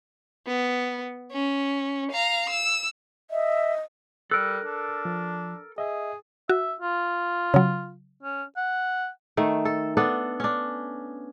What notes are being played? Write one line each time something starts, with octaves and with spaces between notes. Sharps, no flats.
B3
C#4
F5 A#5
E6
D#5 E5
G3 A4 A#4 F#6
D4
F3
G#4 D#5 E5
F#4 E5
F4
C#3 F#3
C#4
F#5
D#3 A3
A4
B3 D4 A4
C#4 D4